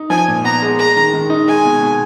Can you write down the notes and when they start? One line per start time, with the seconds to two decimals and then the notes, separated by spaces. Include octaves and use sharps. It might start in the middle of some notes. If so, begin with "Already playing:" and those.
Already playing: D#4
0.10 F3 G#5
0.28 A#2
0.44 B3 A#5
0.62 G#3
0.79 G#3 A#5
0.96 D#3
1.13 D#3
1.30 D#4
1.48 G#3 G#5
1.65 B2
1.81 B2